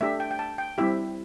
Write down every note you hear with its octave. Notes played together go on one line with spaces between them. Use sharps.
A3 D4 G4 E5
G5
G5
A5
G5
G3 C4 E4 G4 E5